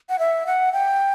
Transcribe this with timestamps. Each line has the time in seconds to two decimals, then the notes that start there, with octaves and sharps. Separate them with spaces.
0.09 F#5
0.19 E5
0.47 F#5
0.73 G5